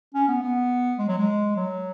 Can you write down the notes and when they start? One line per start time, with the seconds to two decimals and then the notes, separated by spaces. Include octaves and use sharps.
0.14 C#4
0.28 B3
0.42 B3
0.98 G#3
1.08 F#3
1.18 G#3
1.56 F#3